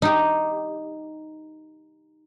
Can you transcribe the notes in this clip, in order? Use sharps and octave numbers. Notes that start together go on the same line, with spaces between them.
D#4 G4